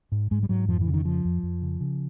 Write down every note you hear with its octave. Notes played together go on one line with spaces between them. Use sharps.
G#2
G#2 G#3
G3
G#2 F#3
F2 F3
E3
C#3
D#3
F2 F3
F2
F2
C#3
C#3